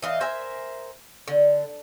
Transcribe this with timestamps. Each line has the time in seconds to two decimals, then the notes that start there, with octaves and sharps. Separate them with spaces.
0.02 E3 D#5 F5
0.21 A#4 C5 E5 G#5
1.28 D3